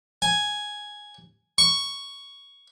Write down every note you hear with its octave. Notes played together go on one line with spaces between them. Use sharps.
G#5
C#6